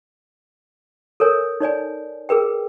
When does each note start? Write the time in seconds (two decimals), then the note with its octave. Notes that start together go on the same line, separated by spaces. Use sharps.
1.20 A4 A#4 C#5 G#5
1.60 D#4 C#5 D5 G#5
2.29 G#4 A#4 B4 G5